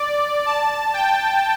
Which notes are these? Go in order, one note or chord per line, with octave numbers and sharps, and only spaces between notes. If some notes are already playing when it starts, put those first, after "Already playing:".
Already playing: D5
A5
G5